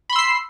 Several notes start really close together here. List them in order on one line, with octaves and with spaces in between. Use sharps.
B5 C6 E6 C7